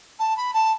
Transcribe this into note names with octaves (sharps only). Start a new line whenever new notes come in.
A5
B5
A5